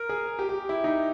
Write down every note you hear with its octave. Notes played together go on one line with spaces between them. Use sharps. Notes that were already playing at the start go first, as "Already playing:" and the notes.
Already playing: A#4
G#4
G4
G4
E4
D#4